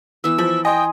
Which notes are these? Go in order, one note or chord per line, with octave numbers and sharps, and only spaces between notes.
E3 B3 E6
F3 B5
D#5 G5 G#5 C6 D#6